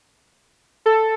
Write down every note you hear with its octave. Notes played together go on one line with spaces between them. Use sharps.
A4